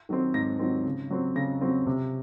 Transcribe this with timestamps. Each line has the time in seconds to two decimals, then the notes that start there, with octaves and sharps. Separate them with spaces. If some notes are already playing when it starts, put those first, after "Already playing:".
0.09 D#3 F#3 C4
0.34 G#2 A#6
0.59 D#3 F#3 C4
0.86 C#3
1.10 F#3 C4
1.36 C#3 A#6
1.61 F#3 C4
1.86 C3